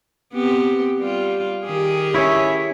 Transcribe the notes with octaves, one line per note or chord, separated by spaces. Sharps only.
B3 C4 G4
G3 F4
D#3 G4 G#4
C#4 E4 C#5 E5